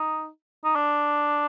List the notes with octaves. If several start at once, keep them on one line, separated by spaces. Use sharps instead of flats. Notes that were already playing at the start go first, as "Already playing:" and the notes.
Already playing: D#4
D#4
D4